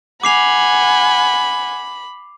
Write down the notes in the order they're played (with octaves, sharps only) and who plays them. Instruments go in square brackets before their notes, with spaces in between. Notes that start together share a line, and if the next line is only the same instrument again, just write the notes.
[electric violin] F#5 G#5 [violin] B5 [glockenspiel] D6 C7 F7